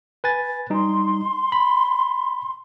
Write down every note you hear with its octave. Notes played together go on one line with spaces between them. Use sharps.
B4 G#5 A6
G3 D#4 C6
B5